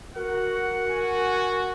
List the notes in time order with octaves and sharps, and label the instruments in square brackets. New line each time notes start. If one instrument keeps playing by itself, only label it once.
[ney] F#4 [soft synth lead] A#4 [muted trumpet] F#5
[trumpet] F#4 [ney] G#5